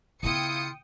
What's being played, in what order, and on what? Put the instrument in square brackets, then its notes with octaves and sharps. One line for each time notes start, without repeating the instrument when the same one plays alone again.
[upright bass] C#3 B3 [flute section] E4 F4 F5 [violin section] G5 D#6 C#7